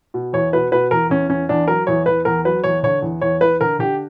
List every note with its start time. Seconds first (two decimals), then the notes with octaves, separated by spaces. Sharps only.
0.14 B2
0.33 E2 C#5
0.53 B2 B4
0.72 B2 B4
0.91 E2 A#4
1.10 E2 C#4
1.29 E2 C#4
1.49 E2 D4
1.68 F#3 A#4
1.87 E2 C#5
2.06 E2 B4
2.25 E2 A#4
2.45 F#3 B4
2.64 E2 C#5
2.83 D3 C#5
3.02 E2
3.21 E2 C#5
3.41 E2 B4
3.61 D3 A#4
3.79 D3 G4